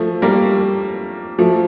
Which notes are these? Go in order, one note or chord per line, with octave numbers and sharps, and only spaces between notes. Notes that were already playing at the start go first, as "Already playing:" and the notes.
Already playing: F3 A3
G3 A#3
F3 A3